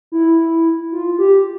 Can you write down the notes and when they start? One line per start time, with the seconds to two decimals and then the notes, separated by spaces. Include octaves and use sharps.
0.12 E4
0.92 F4
1.18 G4